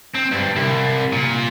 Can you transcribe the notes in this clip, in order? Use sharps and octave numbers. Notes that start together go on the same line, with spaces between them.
C4
G2
C2
A#2